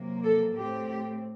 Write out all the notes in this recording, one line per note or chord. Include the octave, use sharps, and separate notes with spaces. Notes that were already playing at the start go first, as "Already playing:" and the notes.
Already playing: C3 F#3 A#3
A4
A2 A3 C4 G4